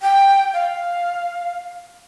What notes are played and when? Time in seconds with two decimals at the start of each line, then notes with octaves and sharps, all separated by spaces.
0.02 G5
0.53 F5